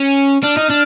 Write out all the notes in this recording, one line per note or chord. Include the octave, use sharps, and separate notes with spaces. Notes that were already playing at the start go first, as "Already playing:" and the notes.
Already playing: C#4
D4 F6
D#4
D4